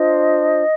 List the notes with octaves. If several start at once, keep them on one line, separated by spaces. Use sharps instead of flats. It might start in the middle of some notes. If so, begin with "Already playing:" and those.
Already playing: D4 F4 C5 D#5